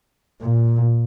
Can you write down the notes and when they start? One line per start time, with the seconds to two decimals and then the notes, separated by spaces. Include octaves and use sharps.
0.42 A#2